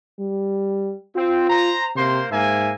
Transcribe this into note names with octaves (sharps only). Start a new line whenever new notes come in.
G3
C4 F4
C5 A#5
C3 A#3 C5 C6
G#2 A#3 E5 G#5